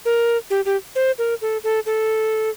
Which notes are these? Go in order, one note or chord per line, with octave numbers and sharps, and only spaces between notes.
A#4
G4
G4
C5
A#4
A4
A4
A4